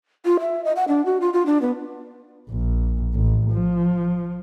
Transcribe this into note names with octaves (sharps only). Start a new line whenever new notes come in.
F4
E5
D#5
F#5
D4
F#4
F4
F4
D4
B3
A#1
A1
F3